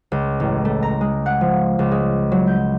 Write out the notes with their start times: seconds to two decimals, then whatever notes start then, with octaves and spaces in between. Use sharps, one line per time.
0.12 C#2
0.40 A1
0.65 A3
0.83 A#5
1.01 G#3
1.26 F#5
1.41 F3
1.79 C#2
1.91 G#3
2.32 F#3
2.47 G6